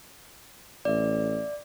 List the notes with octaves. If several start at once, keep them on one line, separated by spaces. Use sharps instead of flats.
A1 D5 E5